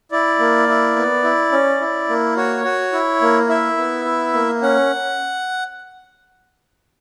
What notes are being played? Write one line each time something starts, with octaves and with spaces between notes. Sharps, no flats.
E4 D5
A#3
E4
B3
E4
C#4
E4
A#3
F#4 C#5
F#4
E4
A#3
E4 E5
B3
E4
A#3
C#4 F#5